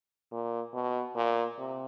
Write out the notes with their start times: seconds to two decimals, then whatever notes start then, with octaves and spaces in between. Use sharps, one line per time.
0.32 A#2
0.74 B2
1.15 A#2
1.58 C3